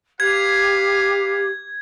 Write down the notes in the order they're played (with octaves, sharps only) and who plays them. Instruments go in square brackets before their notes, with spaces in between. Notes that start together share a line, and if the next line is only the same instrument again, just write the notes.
[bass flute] G4 [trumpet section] B4 F5 [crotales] G#6